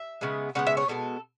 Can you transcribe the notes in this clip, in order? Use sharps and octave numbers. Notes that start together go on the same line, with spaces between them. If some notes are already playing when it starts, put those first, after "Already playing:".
Already playing: E5
C#3 G#3 B3
C#3 G#3 B3 F#5
E5
C#5
B2 G#3 B3 A4